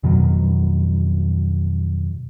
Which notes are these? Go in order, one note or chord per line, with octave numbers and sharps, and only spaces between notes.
F2 B2 D#3 F#3